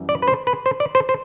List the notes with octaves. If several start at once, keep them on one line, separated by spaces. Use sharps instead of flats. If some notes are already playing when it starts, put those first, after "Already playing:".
Already playing: F#2 E3 G3
D5
B4
C5
B4
C5
D5
C5
C5